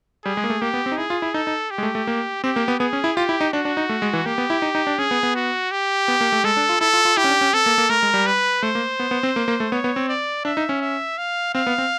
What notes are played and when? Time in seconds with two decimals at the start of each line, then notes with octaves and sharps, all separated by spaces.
0.25 G3 G#4
0.37 G#3
0.44 A#3
0.50 A3
0.61 A#3 G4
0.74 B3
0.86 C4
0.92 D#4
0.98 E4 G#4
1.10 F4
1.22 E4
1.34 D#4 A4
1.47 D#4
1.71 G4
1.78 G#3
1.83 A3
1.95 A3
2.07 A#3
2.44 C4 G4
2.56 A#3
2.68 B3
2.80 B3 G#4
2.93 C#4
3.04 E4
3.16 F4 G4
3.29 E4
3.41 D#4
3.53 D4 F#4
3.65 D4
3.77 D#4
3.89 A3
4.02 G#3
4.13 E3
4.26 A#3 G4
4.38 B3
4.50 E4
4.62 D#4
4.75 D#4
4.87 D4
4.98 C#4 G#4
5.11 B3
5.23 B3
5.35 F#4
5.72 G4
6.08 B3
6.21 A#3
6.32 A3
6.44 G#3 A4
6.57 D4
6.69 F4
6.80 E4 A4
6.93 F4
7.05 F4
7.17 E4 G4
7.24 C#4
7.29 D4
7.41 C#4
7.53 C4 A4
7.66 A#3
7.78 A#3
7.89 A3 A#4
8.03 G#3
8.14 G3
8.26 B4
8.63 A3 C5
8.75 A#3
9.00 B3
9.11 B3
9.23 C4
9.36 A#3
9.48 A#3
9.60 A3
9.72 B3 C#5
9.84 B3
9.96 C4
10.09 D5
10.45 D4 E5
10.57 D#4
10.69 C#4
10.81 E5
11.18 F5
11.54 C4 F5
11.67 B3
11.78 C4